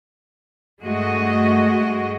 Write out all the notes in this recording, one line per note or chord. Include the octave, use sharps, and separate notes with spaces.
G2 G#3 A3 F#4 D#5